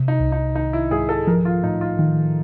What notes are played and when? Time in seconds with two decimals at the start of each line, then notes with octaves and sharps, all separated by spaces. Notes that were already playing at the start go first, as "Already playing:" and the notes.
Already playing: C3
0.08 D#4
0.20 C2
0.32 D#4
0.55 D#3 D#4
0.73 E4
0.91 G#2 G#4
1.09 A4
1.27 F3 A#4
1.45 F4
1.63 A2 D#4
1.81 F4
1.99 D#3